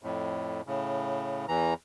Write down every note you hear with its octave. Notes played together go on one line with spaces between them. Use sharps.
F2 A2
A2 C#3
E2 E3 A#5